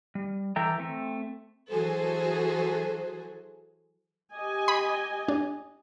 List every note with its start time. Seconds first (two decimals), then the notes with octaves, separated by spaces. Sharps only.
0.15 G3
0.56 E3 A4 E5 G5 A#5
0.80 A3 C4
1.71 E3 F#3 F#4 G#4 A4 C5
4.33 G4 D#5 G#5
4.68 B5
5.28 D4